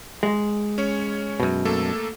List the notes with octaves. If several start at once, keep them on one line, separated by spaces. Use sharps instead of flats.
G#3
C#4 C#5
F#2 B2
A3 A#3 A4